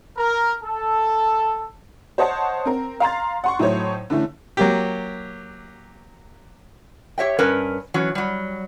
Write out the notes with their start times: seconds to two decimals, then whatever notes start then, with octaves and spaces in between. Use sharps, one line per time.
0.18 A#4
0.63 A4
2.18 C5 C#5 D#5 F#5 A5
2.65 C4 A#4
3.00 F5 A#5 C6 A6
3.44 F#5 C6 C#6
3.59 A2 F#3 A3 D#4 C5 C#5
4.10 D3 E3 A3 C#4
4.57 F#3 A#3 G4
7.18 G4 C#5 E5 G5
7.39 G2 C#4 A#4 B4
7.94 E3 F#3 C#4
8.15 F#3 G3